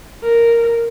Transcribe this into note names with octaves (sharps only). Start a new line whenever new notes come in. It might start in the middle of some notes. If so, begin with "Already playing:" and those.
A#4